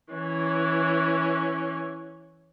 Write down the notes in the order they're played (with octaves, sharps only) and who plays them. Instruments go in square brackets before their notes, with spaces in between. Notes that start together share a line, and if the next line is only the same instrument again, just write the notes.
[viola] E3 C#4